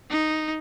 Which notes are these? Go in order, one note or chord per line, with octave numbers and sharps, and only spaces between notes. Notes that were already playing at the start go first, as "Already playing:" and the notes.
D#4